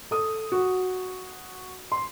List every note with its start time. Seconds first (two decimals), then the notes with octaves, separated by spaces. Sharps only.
0.11 A4 D#6
0.52 F#4
1.92 C6